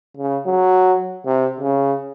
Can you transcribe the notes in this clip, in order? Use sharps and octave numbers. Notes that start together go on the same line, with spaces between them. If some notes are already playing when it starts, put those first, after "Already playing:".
C#3
F#3
C3
C#3